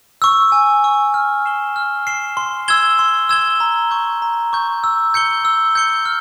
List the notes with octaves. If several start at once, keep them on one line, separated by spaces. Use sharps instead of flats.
C#6 E6
G#5
C#6 E6
F6
C7 E7 G7
F6
C7 E7 G7
C6
E6 G#6 E7 G7
C6
E6 G#6 E7 G7
A#5
C#6 G6
A#5
C#6 G6
E6
G6 C#7 G7
E6
G6 C#7 G7
F6